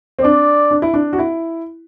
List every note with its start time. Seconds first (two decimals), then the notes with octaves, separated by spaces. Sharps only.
0.19 C4
0.24 D4 D5
0.71 D4
0.82 E4
0.94 D4
1.13 F#4
1.18 E4